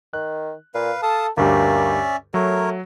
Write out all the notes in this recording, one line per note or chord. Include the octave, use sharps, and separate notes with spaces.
D#3 F#6
A#2 B4 F5
A4 F5 A5 D#6
D2 G2 A#3 C#4 G4 D5 E5
F#3 A3 A#4 C#5